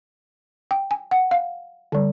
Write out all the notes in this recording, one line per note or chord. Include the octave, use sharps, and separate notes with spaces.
G5
G#5
F#5
F5
D3 G3